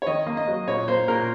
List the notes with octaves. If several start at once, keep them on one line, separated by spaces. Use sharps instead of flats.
C#5
D#3 D#5
A#3
D#5
F#3
A#2 C#5
A#3 C5
A#2 A#4